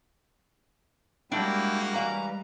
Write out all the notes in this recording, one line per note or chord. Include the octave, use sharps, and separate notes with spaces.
G3 G#3 A#3 D4 E4 F#4 G5
E3 B4 F5 A#5